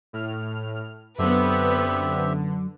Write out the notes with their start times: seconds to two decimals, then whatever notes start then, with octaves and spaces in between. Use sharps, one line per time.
0.13 A2 F6
1.19 F#2 D3 B3 C4 G4 B4 E5